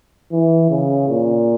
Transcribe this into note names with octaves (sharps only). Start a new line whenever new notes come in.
E3
C#3
A#2